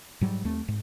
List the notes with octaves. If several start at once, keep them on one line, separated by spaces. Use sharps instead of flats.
G#2 F#3 G3
D#2 A3 C4
G#2